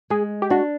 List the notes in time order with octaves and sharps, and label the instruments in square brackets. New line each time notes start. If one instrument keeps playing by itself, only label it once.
[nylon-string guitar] G#3 [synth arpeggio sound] G#4
[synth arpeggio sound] G4
[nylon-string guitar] D4 [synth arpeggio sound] F#4